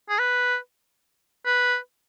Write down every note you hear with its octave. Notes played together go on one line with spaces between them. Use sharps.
G#4
B4
B4